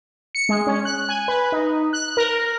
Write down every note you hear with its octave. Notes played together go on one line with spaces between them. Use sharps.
C#7
G#3
C#4
F#6
G#5
B4
D#4
F#6
A#4